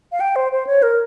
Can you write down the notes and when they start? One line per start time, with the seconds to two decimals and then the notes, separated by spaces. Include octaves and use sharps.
0.12 F5
0.20 G5
0.36 C5
0.52 C5
0.67 C#5
0.83 A#4